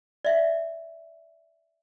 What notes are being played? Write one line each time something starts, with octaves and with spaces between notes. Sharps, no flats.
D5 E5